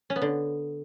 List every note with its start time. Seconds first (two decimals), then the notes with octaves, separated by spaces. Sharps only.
0.10 C#4
0.16 B3
0.22 D3